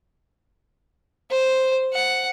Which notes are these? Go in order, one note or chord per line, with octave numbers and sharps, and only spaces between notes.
C5
F#5